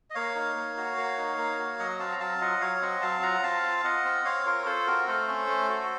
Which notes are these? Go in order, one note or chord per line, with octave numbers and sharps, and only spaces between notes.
D#5
A#3 C#5 F5
D#4
A#3
F#4
A#3
D#4
A#3
F#4
F#3 D#5 F#5
C4 F5 A5
A#5
F#3 F5 A5
F4 D#5 F#5
F#3 C#5 F5
C4 D#5 F#5
F#3 F5 A5
F4 F#5 A#5
C4 F5 A5
F4
F4 D#5 F#5
C4
C4 C#5 F5
F4 A#4 C#5
F4 A4 C5
C4 F#4 A#4
A3 A4 C5
C#4
A3
F#4